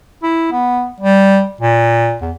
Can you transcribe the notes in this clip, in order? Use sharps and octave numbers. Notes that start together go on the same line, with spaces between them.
E4
B3
G3
A#2
E2